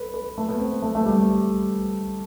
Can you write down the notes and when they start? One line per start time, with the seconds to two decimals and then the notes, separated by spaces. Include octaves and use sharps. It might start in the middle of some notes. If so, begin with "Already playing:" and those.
Already playing: A4 B4
0.14 B4
0.38 A3
0.49 B3
0.59 C4
0.82 A3
0.95 A3
1.05 G3